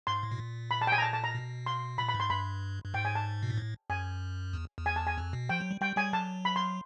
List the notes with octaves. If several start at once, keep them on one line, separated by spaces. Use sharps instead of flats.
G#2 C6
A2
B2
A#2
B5
A5
G5
G#5
A#5
A5
A5
A#5
B2
C6
A#2 B5
B5
G#2
C6
G2 B5
G2
G#2 G5
G#5
A5
B2
A#2
A2
F#2 G#5
E2
E2
G#5
A5
G#5
F2
B2
F3 G5
F#3
G3
G3 G5
G3 G#5
F#3 A5
B5
C6